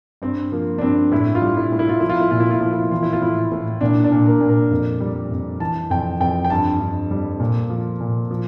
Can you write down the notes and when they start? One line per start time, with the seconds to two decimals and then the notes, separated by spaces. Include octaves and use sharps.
0.22 G2 C4
0.52 F3 A#3
0.78 D4
0.81 G2 C4
1.12 A2 E4
1.35 F4
1.42 G3
1.57 E4
1.72 A2
1.79 E4
1.89 F4
2.00 F3 E4
2.09 F4
2.20 E4
2.31 A#2 F4
2.40 E4
2.51 F4
2.61 F3 E4
2.71 F4
2.81 E4
2.91 E3 F4
3.03 E4
3.13 F4
3.22 A2 E4
3.52 A2
3.81 A#2 D4
4.04 D4
4.12 A#2
4.26 A#4
4.41 A#2
4.49 A#4
4.71 F2
5.00 G3
5.31 F2
5.60 E3 A5
5.90 F2 G5
6.20 F2 G5
6.45 G5
6.50 G2 A5
6.80 G2
7.11 G3
7.40 A#2
7.70 F3
8.00 A#2
8.31 F3